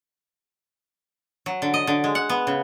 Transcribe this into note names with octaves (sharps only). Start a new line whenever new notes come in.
F#3
D3
D#5
D3
G#3
F#5
B3
C#3